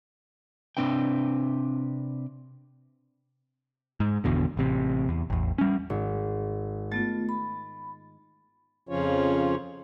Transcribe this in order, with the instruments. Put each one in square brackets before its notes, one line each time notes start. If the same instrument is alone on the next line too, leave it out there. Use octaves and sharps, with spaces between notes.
[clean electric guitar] C3 F3 C4 D4 B4 G5
[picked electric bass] G#2
G#1 E2 B2 D3
A1 C3
E2
A1 E2
G3 C#4
[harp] G#1
[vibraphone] A3 B3 F4 [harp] A6
[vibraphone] B5
[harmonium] F2 C#3 F3 C#4 F4 C#5